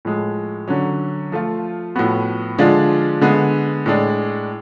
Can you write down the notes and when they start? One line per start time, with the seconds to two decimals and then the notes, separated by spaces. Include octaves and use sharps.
0.05 A2 F3 G#3
0.68 D3 F#3 C#4
1.32 F3 A3 F4
1.96 A2 F3 B3 F#4
2.58 D3 F3 G#3 D4 F4
3.21 D3 G#3 B3
3.86 A2 G#3 D4